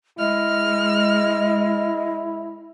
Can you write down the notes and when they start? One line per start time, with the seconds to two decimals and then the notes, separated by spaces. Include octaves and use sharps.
0.19 G#3 E4 D#5 F6